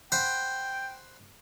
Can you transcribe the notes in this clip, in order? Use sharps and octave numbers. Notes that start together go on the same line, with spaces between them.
C5 F#5 G5 B5